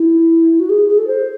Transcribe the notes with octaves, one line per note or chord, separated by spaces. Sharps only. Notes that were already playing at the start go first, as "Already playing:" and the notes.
Already playing: E4
F#4
G#4
G#4
A4
C5